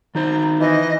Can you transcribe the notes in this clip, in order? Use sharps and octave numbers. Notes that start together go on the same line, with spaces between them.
D#3 D#4 C5 A#5
E3 D#5